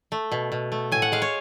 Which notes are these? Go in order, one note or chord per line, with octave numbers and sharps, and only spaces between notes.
A3
B2
B2
A3
A2 G#5
F#5
G#3 F5
C#5